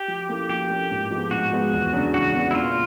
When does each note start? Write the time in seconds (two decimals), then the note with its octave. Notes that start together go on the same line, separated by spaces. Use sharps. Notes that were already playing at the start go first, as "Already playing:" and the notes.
Already playing: G4
0.08 F3
0.29 A#3 C#4 E4 A4
0.49 F3 G4
0.70 A#3 C#4 E4 A4
0.91 G#2
1.11 F3 G#3 B3
1.31 G#2 F#4
1.52 F3 G#3 B3
1.73 E2
1.93 C#3 F#3 B3 D4
2.14 E2 F#4
2.34 C#3 F#3 B3 D4
2.51 E4
2.55 A#2 F4